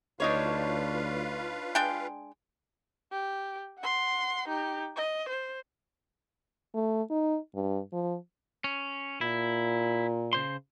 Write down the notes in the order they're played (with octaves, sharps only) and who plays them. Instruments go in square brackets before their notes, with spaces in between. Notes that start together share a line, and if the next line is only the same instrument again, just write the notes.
[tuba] D2 [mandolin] D4 D#4 C#5 [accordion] F4 B4 F5
[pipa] G#3 D4 G5
[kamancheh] G4
F#5 C6
D#4 G4
D#5
C5
[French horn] A3
D#4
G2
F3
[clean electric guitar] C#4
[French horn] A#2 [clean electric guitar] E4
[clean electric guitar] C#3 C5 C6